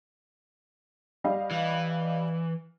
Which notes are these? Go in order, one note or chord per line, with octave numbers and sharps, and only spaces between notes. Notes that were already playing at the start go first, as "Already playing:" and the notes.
G3 D#5 F5
E3